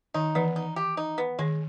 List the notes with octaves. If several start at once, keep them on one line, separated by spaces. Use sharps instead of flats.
D#3 D#4
E3 B3
D#4
G4
D#4
B3
D#3 G#3